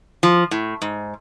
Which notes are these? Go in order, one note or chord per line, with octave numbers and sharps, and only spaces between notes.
F3
A2
G#2